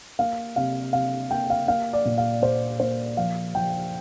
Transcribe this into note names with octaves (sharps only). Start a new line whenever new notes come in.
A#3 F5
C3 F5
C3 F5
A#3 G5
F5
A#3 F5
D5
A#2
F5
A#2 C5
A#3 C5
F3 F5
F3 G5